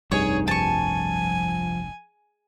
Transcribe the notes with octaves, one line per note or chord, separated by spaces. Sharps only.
F1 C2 G2 D#4 G#4 C#5
F3 G#5 A5 C#6